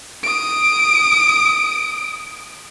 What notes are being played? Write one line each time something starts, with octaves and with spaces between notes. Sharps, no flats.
D#6 D7